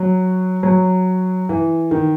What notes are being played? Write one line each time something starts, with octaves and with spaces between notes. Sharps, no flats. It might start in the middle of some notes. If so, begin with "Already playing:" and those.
Already playing: F#3
F#3
E3
D#3